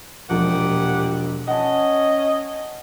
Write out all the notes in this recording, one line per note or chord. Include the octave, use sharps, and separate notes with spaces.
E1 A#2 F3 G4 F#5
C#4 D#5 F#5 A5